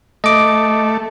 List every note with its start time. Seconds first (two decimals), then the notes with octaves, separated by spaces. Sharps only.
0.24 A3 D#5 D6